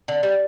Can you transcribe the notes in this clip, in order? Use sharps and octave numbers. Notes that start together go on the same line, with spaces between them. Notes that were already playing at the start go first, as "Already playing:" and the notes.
D3
G3